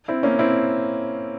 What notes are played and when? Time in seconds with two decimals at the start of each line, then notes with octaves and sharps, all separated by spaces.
0.08 C4 E4
0.23 A#3 C#4
0.39 C4 E4